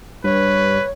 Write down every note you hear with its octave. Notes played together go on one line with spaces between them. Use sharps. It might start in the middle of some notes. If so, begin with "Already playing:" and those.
G2 B4 C#5